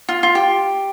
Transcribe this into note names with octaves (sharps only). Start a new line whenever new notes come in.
F4
F4
G4